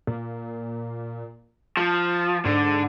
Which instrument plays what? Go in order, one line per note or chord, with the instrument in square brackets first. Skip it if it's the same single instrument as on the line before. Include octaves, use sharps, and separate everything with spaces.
[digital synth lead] A#2
[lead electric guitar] F3 [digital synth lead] A5
[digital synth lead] G#2 [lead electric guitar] D3